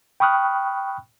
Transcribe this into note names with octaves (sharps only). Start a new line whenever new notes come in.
G5 B5 C#6 D#6 F6 F#6